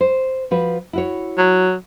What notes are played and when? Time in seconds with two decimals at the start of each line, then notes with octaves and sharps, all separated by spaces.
0.01 C5
0.51 F3 F#4 B4
0.93 E4 F#4 C#5
1.37 F#3